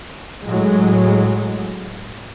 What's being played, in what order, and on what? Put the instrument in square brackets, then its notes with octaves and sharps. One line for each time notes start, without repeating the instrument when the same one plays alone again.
[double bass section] A2 F#3 G#3